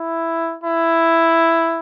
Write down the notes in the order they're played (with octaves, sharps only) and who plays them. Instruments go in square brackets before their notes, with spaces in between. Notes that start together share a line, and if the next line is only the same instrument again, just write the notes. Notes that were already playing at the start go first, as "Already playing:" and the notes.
Already playing: [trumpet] E4
E4